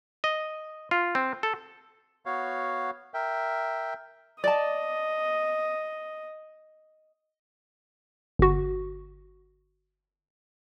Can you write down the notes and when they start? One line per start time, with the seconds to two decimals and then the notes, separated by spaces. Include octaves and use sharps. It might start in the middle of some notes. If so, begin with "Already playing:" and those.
0.24 D#5
0.91 F4
1.15 C4
1.43 A4
2.26 B3 F#4 C#5 F5
3.14 A#4 E5 G5
4.44 D5 D#5 A5
8.39 G1 F#4